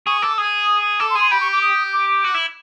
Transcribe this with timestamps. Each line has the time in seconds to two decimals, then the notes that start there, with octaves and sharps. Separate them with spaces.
0.07 G#4 C#6
0.22 A4 D6
0.37 G#4 D#6
1.00 A4 D6
1.10 C6
1.15 G#4
1.21 C6
1.31 G4 B5
1.41 C#6
1.52 D6
1.62 D#6
1.93 D6
2.24 F#4
2.34 E4